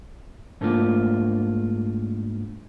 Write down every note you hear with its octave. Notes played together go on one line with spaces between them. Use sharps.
G#2 A3 A#3 D4 F4